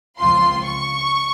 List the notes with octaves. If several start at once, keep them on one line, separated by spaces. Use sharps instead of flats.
C#2 C3 F3 C4 F4 C6
C#6